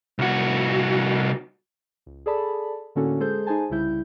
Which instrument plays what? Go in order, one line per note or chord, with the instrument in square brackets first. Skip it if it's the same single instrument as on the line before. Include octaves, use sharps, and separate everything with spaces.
[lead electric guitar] C2 F#4
[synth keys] C#2
G#4 A4 D5 A5 B5
A2 D3 A#3 C#4 F#4 A4
G#3 G#4 A4 C5 G6
D#4 G#4 C5 G#5 A5
C2 C#3 G3 E4 G6